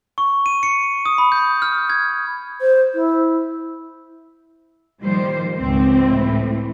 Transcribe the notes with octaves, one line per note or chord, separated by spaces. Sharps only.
C#6
D#7
C#7
D#6
B5
G6
F6
G#6
C5
E4
A#2 D#3 F3 G3 C5
C#2 G#2 C4
A2 E3